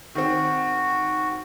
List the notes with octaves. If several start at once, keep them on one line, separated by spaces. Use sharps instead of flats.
D#3 C4 F#4